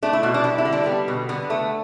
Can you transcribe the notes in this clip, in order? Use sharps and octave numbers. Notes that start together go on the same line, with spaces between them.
A3 D4
E4
B2 F#4
D4
G3 E4
E4
D3
D4
G3 B3
B2
D3 B3
A3